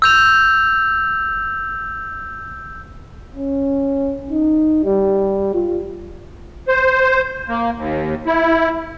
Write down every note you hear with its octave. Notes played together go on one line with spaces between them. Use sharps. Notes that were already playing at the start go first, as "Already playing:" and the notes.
E6 G6 F7
C#4
D#4
G3
F4
C5
A#3
D#2
E4